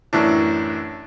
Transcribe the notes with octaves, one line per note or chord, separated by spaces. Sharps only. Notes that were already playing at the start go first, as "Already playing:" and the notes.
F#2 A2 E3 D4